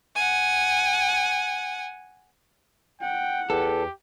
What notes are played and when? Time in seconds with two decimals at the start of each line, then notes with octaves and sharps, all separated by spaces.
0.15 F#5 G#5
3.01 F#5 G5
3.50 E2 G4 A4